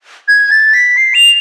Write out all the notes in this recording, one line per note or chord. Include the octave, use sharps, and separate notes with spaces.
G#6
A6
B6
C7
F7